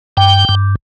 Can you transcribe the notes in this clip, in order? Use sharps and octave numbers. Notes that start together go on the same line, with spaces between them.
G2 G5
G2